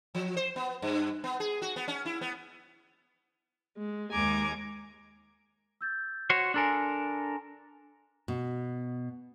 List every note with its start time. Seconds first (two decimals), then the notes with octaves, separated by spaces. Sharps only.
0.15 F3
0.37 C5
0.56 B3
0.82 G2
1.24 B3
1.40 G#4
1.62 F#4
1.76 B3
1.88 C#4
2.05 E4
2.21 B3
3.77 G#3
4.12 D#2 G#3 G#5 A#5 D6
5.81 E6 G6 A6
6.30 F#4 C5 C#5
6.54 D4 A4 A#4 G#5 A#5 C6
8.28 B2